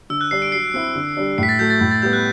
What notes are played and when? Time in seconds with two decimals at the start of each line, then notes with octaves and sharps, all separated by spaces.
0.10 D3 E6
0.21 F#6
0.31 G3 D4 C7
0.42 D7
0.52 F#3 C7
0.74 C4 E4
0.95 D3
1.17 G3 D4
1.38 A2 B6 C7
1.49 A6
1.59 F#3 A3 G6
1.70 A6
1.81 A2
1.91 A6
2.02 G3 G6
2.05 B3
2.13 F#6